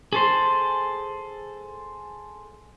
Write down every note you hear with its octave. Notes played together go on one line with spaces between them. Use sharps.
G#4 A4 C5